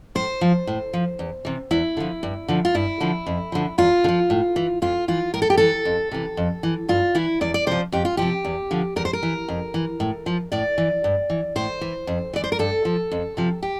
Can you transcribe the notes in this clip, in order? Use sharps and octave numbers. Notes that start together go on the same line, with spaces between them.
A2 C5
F3
A2
F3
E2
C3 E3
E2 E4
D3 F3
G2
D3 F3
F4
G2 E4
D3 F3
F2
D3 F3
E2 F4
D3
F3
A2
E3
F2 F4
E3 F4
A2 A#4
A4
G4
E3 A4
F2
C3 E3
F2
E3
G2 F4
E3 E4
E2 D5
D5
C3 F3 C5
F2 G4
F4
C3 F3 G4
E2
D3 F3
E2 A#4
C5
A#4
E3
F2
E3
A2
F3
A2 D5
E3
G2
E3
A2 C5
E3
F2
E3 D5
C5
A#4
G2 A4
F3
F2
C3 F3
G4